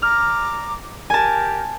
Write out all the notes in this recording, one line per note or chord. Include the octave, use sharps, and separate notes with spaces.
D5 A#5 D6 F6
G4 A#4 G#5 A5